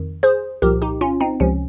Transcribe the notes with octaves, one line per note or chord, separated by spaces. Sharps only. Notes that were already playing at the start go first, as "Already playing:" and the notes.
Already playing: F2 D#3
G#4 C5
C2 A#2 F3 G4 A#4
D#4 G4
C#4 F4
C4 D#4
C#2 C3 F3 C#4